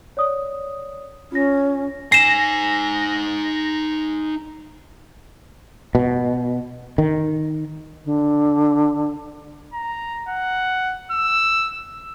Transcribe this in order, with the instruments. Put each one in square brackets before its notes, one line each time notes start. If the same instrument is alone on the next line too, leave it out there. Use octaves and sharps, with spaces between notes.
[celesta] C#5 D5 D#6
[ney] C#4 [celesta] F4 A#6
[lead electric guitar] D#4 G#5 [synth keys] A#6 [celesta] C7 E7
[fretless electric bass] B2
D#3
[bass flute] D3
[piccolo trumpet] A#5
F#5
E6